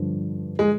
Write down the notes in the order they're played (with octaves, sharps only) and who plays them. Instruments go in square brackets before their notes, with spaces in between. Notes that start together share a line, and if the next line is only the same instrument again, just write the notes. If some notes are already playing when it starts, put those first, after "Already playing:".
Already playing: [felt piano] G2 D3 F3
[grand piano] G#3